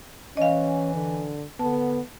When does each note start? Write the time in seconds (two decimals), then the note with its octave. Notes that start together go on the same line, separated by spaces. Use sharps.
0.37 E3 C#4 D#5 F5
0.94 D3
1.59 D3 B3 A5